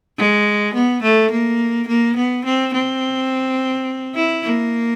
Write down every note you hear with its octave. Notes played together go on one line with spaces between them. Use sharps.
G#3
B3
A3
A#3
A#3
B3
C4
C4
E4
A#3